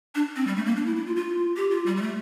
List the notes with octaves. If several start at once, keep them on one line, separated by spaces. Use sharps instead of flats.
D4
C4
G3
A3
A#3
D4
E4
E4
F4
F4
G4
F4
G3
G3
A3